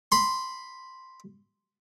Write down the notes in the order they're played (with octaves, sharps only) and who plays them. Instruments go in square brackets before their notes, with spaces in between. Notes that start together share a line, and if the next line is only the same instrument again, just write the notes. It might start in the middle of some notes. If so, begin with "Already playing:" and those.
[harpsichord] B5 C6